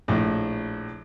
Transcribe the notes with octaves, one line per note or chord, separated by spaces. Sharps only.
A#1 A2